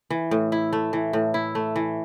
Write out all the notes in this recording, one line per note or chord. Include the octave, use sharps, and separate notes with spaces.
E3
A2
E4
A3
E3
A2
E4
A3
E3